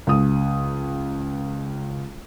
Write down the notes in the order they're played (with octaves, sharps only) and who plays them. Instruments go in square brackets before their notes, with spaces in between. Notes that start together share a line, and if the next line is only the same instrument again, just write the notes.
[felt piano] C#2 D#6